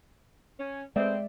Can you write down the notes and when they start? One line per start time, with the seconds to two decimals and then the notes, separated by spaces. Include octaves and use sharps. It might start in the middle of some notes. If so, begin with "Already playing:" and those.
0.60 C#4
0.96 G#3 A3 B3 C4 D5 E5